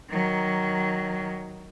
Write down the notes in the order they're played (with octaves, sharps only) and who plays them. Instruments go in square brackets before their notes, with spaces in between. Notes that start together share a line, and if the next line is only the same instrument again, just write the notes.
[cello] D#3 F#3